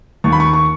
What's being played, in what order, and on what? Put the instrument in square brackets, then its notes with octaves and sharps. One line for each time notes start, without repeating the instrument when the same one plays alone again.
[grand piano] D#2 C#6
B5
C#6
C#6